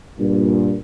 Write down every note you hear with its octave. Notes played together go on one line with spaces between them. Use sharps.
G2 A#2